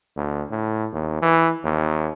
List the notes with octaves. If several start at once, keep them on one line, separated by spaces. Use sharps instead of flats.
D2
A2
D#2
E3
D#2